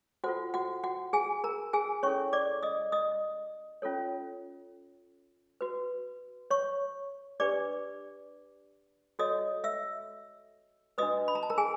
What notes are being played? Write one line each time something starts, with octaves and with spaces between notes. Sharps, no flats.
F4 F#4 A4 C5 F#5
F#4 F#5
F#4 F#5
G#4 G#5
A#4 A#5
G#4 G#5
C#4 E4 A4 C#5 C#6
D5 D6
D#5 D#6
D#5 D#6
C#4 F4 A4 C#5
F#4 B4
C#5 C#6
D4 G4 B4 D5 D6
F#4 A4 C#5 D#5 D#6
E5 E6
D4 F#4 B4 D#5 D#6
B5
A#5
A5
A#4 A#5
G#4 G#5